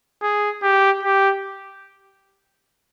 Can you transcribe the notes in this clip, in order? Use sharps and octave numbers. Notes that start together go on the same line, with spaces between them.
G#4
G4
G4